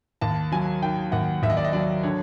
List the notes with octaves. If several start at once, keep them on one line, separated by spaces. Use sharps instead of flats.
D#2 A5
F#3 G#5
D#3 G5
D#2 F#5
D#2 E5
D#5
D5
D#5
F#3 D5
D3 C#5